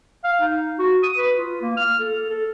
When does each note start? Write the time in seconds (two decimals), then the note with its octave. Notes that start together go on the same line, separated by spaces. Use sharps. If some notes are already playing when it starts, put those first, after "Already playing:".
0.24 F5
0.41 D#4
0.79 F#4
1.03 D#6
1.16 B4
1.38 F4
1.62 A#3
1.77 F6
1.99 A4
2.30 A4